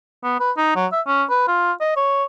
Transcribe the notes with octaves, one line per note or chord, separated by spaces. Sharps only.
B3
B4
D#4
F#3
E5
C#4
B4
F4
D#5
C#5